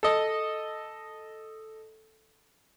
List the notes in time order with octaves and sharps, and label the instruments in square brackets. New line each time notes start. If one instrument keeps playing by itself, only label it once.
[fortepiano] A4 D#5